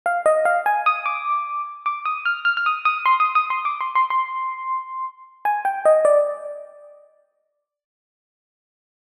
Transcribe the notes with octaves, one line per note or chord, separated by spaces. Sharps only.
F5
D#5
F5
G#5
D#6
D6
D6
D#6
F6
F6
F6
D#6
D#6
C6
D#6
D#6
C6
D6
C6
C6
C6
G#5
G5
D#5
D5